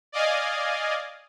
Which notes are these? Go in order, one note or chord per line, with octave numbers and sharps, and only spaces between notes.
D5 D#5 F5 G#5